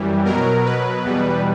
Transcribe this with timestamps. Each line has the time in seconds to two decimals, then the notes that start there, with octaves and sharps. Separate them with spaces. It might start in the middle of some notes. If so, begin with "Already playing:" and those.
Already playing: F#2 E3 G3
0.24 B2 F#3 A#4
0.65 B4
1.04 E2 B2 G3